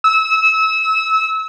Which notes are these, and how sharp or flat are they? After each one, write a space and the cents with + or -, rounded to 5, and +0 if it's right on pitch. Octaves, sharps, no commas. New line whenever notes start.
E6 -30